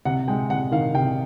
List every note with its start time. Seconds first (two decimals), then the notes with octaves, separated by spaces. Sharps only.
0.05 C3 F#5
0.28 G#3 G5
0.50 C3 F#5
0.72 D#3 F5
0.95 C3 G5